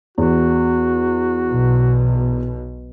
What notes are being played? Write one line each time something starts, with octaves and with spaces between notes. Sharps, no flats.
E2 F#4
B1 B2